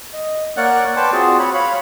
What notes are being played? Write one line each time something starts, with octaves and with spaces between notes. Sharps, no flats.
D#5
A#3 A#4 C#5 D5 F#5 F#6
B4 D5 G5 A5 C6 D6
C4 F4 F#4 G#4
C#5 B5
C#5 F5 B5